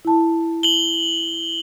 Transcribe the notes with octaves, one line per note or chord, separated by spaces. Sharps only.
E4 A5
F#7 G7